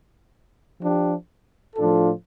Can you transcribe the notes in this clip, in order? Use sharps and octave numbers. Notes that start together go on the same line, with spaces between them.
F3 D4 G4
A2 F3 D4 F4 A4